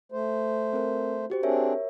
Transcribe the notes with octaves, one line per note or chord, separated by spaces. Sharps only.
A3 C5
C4 A#4
F#4 G4 C5
C4 D4 G#4 A#4 C#5 E5